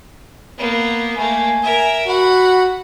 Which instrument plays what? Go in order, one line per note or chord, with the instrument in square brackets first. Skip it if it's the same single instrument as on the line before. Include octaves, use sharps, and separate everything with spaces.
[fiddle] A#3 B3
[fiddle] A3 A#3 [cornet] G#5
[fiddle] A#4 E5
[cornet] F#4 [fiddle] F#5 B5